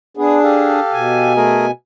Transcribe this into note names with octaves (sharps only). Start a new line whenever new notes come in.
B3 D4 G#4
G4 A4 F5
B2 G#5
A3 G#4 A#4